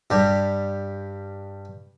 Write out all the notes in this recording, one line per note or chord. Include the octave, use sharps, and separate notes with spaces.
G2 G3